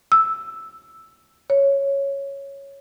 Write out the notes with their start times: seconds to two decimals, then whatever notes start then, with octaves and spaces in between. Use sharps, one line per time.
0.12 E6
1.50 C#5